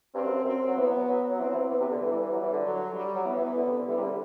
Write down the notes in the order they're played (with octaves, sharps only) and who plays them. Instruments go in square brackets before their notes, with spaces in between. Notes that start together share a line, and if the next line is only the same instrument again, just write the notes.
[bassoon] G2 [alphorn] C4
[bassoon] F#2
[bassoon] F#2 [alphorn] C4
[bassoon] F#3
[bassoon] E3 [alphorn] B3
[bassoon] F#3
F#3
F#3
F#3
[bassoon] E3 [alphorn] C4
[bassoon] F#3
E3
[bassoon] E3 [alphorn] B3
[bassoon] C3
D3
[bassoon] E3 [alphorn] G3
[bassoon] E3
E3
F#3
E3
D3
[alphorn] F#3
G3
[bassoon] F#3
[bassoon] E3 [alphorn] B3
[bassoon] E3
E3
D3
C3
D3
[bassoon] E3 [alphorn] G3
[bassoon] C3
D3